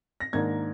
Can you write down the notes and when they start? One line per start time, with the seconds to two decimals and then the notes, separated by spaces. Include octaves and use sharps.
0.20 A#6
0.33 G#2 D#3 A#3 D4 G#6